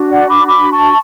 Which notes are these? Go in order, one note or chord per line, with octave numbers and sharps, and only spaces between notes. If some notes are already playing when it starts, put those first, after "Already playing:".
Already playing: D4 F#4
D5 F#5
B5 D6
B5 D6
A5 C#6